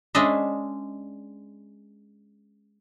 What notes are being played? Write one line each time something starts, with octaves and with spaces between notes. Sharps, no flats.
G#3 C#4 D4 D#5 E5